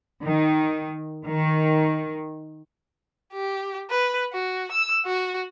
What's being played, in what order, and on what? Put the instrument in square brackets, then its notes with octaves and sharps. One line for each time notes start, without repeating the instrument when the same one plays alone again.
[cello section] D#3
D#3
[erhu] G4
B4
F#4
E6
F#4